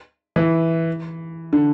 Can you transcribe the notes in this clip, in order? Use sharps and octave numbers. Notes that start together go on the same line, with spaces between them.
E3
D3